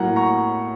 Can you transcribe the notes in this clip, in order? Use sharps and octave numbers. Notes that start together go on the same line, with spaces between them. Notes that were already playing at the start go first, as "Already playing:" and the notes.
Already playing: A2 F#3 A#3 F#5 A#5
A#5 C#6